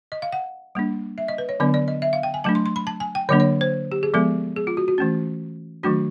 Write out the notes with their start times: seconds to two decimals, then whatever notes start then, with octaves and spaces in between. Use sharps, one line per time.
0.12 D#5
0.22 F5
0.32 F#5
0.75 G3 A#3 D4
1.18 E5
1.28 D#5
1.38 B4
1.49 C#5
1.60 D3 F#3 B3 D4 D5
1.74 D5
1.88 D#5
2.02 E5
2.13 F5
2.23 G5
2.34 G#5
2.44 F#3 A3 D4 A5
2.55 C6
2.66 C6
2.76 B5
2.87 A5
3.00 G#5
3.15 G5
3.29 D3 F#3 A#3 D4 C#5
3.40 C#5
3.61 C5
3.92 G4
4.03 G#4
4.14 F3 G#3 B3 A4
4.56 G#4
4.67 F4
4.77 F#4
4.88 F#4
4.98 E3 A3 C#4
5.83 D#3 F#3 A3 D4 F#4